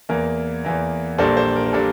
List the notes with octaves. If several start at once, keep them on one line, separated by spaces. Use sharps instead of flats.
E2 E3 A#3 A#4
E2 E3 A#3
A#1 A#2 G3 A#3 D4 A4 C5
A4 C5
A#4
A#4
A#2 G3 A#3 D4 A4